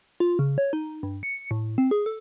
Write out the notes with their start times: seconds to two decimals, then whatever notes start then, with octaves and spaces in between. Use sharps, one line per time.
0.20 F4
0.39 C#3
0.58 C#5
0.73 D#4
1.03 G2
1.23 C#7
1.51 A2
1.78 C4
1.91 G#4
2.06 A4